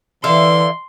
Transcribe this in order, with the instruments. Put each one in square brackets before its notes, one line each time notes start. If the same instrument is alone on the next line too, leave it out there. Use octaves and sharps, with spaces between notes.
[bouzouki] D3 E5 F5 [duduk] E3 [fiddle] C6